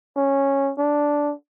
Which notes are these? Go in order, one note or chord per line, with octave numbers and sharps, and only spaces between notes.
C#4
D4